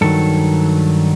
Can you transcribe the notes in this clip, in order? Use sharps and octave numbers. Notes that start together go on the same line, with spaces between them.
G2 D#3 F#3 A4